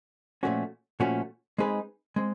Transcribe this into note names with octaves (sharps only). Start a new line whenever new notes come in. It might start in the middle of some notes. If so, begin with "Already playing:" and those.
A#2 F3 A3 C#4 F#4
A#2 F3 A3 C#4 F#4
G#3 C4 D#4 G#4 B4
G#3 C4